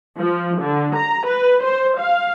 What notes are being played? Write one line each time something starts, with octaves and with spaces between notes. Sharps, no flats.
F3
D3
A#5
B4
C5
F5